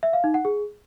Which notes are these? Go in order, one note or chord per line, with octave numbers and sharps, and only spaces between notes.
E5
F5
D#4
F#5
G#4